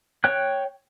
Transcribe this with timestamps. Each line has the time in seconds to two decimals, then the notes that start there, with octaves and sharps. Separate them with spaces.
0.24 C#5 G5 F#6